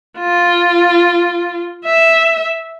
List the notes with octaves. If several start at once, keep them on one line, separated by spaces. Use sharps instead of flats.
F4
E5